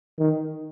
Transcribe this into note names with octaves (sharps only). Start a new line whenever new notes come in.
D#3